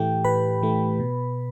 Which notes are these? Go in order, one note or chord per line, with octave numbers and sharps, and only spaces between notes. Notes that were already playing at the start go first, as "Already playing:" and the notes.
Already playing: A2 E3 A3 G4 G5
A2 B4 B5
E3 A3
B2